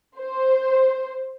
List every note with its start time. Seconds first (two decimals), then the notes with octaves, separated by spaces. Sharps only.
0.18 C5